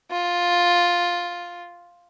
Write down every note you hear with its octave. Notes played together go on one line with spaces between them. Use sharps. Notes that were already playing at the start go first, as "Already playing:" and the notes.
F4